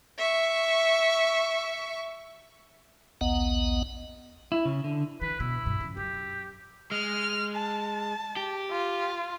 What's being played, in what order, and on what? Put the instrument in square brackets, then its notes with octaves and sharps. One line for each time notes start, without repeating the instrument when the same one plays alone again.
[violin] E5 C#6
[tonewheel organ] A#1 D#2 B3 D#5 F#5
[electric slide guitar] E4
C#3
D3
[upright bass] E3 [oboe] B4
[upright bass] B2 [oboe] E4
[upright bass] G2 B2
C#3 F3
[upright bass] F#2 [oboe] G4
[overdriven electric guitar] G#3 [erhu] F6
[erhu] A5
[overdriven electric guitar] G4
[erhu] F4